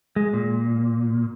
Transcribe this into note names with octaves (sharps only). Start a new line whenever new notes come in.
G#3
A#2